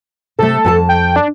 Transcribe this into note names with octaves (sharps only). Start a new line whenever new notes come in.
C3 A3 A4
F2 G#5 A5
G5
D4